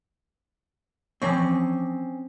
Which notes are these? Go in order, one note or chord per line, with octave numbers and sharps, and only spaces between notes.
E3 F3 C4 C#4 C#6